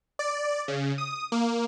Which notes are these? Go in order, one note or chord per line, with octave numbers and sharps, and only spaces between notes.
D5
C#3
D#6
A#3